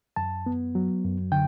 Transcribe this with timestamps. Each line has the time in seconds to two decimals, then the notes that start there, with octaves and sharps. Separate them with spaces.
0.16 F#2 A5
0.46 B3
0.75 F#3
1.04 F#2
1.32 D3 G5